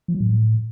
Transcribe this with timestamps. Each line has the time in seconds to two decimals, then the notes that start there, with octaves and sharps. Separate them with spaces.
0.08 F3
0.14 F#3
0.21 A2